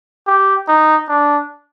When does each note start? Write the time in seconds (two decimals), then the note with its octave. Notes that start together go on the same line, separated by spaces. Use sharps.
0.27 G4
0.68 D#4
1.09 D4